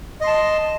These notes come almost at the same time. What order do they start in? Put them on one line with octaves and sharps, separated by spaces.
D#5 C6 A5